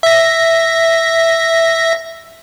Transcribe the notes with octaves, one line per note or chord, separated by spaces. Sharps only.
E5 A#6